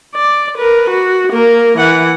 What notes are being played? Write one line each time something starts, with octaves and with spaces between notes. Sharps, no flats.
D5
A#4 B4
F#4
A#3 A#4
E3 F#5